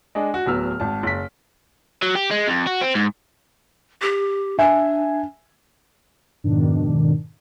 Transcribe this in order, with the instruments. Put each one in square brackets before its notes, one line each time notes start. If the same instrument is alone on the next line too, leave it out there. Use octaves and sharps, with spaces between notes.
[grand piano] G#3 D4 D#5
F#4
D1 F#3 B3 E6 F6
G#1 A5
F#1 B6
[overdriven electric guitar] F#3
G4
G#3
F2
F#4
C4
G#2
[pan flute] G4
[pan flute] D4 [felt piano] E5 G#5
[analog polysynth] F2 G#2 B2 D#3 D4